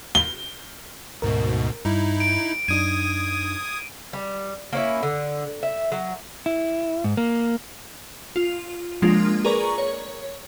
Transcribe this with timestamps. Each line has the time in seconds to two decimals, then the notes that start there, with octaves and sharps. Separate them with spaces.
0.15 G7
1.22 D2 G#2 B2 A#4
1.85 G2 D#4 E4
2.20 D7
2.68 F#2 D4 D#4 D#6 G#6 D#7
4.13 G3
4.73 A#3 C#4 E4
5.03 D3
5.63 E5
5.92 F#3
6.46 E4
7.04 G#2
7.17 A#3
8.36 F4
9.02 F3 G#3 A#3 D4 F4
9.45 G#4 A#4 B4 D5 A#5 C#6
9.78 C#5